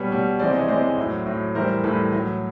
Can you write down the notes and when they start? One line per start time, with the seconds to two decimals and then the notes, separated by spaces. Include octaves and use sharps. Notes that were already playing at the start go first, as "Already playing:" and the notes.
Already playing: B2 G3 B4 C#5
0.11 B2 G3
0.39 C3 E3 G#3 C5 D5
0.54 C#5 D#5
0.68 C3 E3 G#3 C5 D5
0.97 A2 F#3
1.26 A2 F#3
1.55 A2 E3 G3 A#4 C5
1.84 A2 E3 G3 A4 B4
2.13 A2 F#3